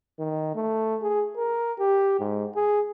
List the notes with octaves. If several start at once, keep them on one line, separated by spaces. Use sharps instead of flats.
D#3
A3
G#4
A#4
G4
G#2
G#4